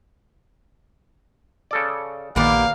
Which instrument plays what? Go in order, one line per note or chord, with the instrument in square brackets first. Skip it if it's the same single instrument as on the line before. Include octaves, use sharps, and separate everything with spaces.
[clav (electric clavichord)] C#3 A4 D5
[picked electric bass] A#1 D#3 [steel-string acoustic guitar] A#3 B3 G4 [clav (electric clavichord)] B4 D5 [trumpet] F5